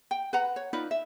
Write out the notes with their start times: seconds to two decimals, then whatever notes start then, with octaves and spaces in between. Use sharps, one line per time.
0.11 G5
0.33 B4 F#5 A#5
0.56 C#5
0.73 D#4 F4 B4 D5
0.91 E5